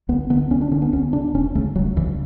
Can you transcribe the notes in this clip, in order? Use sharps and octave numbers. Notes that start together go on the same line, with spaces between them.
D2 B3
D3 B3
D2 C#4
D4
D3 C#4
B3
D2 C#4
C#3 D4
E1 C#4
D2 C#3 A3
E1 F#3
D2 C#3 E3